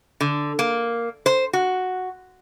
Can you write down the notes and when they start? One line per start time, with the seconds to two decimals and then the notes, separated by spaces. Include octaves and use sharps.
0.21 D3
0.59 A#3
1.26 C5
1.53 F#4